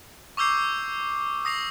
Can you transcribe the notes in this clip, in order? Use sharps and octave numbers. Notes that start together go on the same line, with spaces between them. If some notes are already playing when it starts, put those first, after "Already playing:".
C#6 D6 E6 G6 C7
D#6 A#6 C7 F7